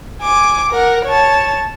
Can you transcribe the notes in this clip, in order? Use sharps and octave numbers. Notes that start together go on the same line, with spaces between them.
G#5 D6
A#4 F#5
C#5 A5